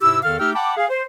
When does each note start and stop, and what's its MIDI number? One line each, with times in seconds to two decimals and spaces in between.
0.01 0.19 44
0.01 0.19 48
0.01 0.19 64
0.01 0.19 67
0.01 0.19 88
0.23 0.39 40
0.23 0.39 51
0.23 0.39 69
0.23 0.39 77
0.23 0.39 89
0.39 0.53 57
0.39 0.53 63
0.39 0.53 67
0.39 0.53 79
0.39 0.53 88
0.39 0.53 89
0.55 0.76 78
0.55 0.76 79
0.55 0.76 81
0.55 0.76 83
0.55 0.76 86
0.76 0.86 68
0.76 0.86 77
0.89 1.03 72